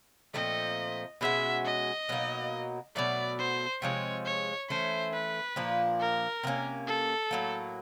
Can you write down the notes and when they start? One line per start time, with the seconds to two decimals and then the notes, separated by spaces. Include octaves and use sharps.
0.34 A#2 F3 A3 C4 D#5
1.21 B2 G#3 C#4 F#4 E5
1.65 D#5
2.09 B2 F#3 A#3 D#4
2.95 B2 F#3 A3 D5
3.39 C5
3.82 C3 F3 G#3 C#5
4.25 C#5
4.70 E3 A3 C#4 C5
5.13 B4
5.56 A#2 F3 A#3 D4
6.00 A#4
6.43 C3 F3 A#3 C#4
6.87 A4
7.31 A2 F#3 A#3